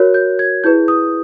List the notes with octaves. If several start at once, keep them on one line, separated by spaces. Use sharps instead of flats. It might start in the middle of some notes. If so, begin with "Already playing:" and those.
Already playing: F#4 A#4 C#5 F#6
G6
G#6
E4 G#4 B4 G6
D#6